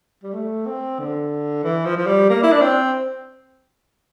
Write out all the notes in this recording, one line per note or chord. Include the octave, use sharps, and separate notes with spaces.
G3
A3
C4
D3
E3
F3
F3
G3
A#3
E4
D4
C4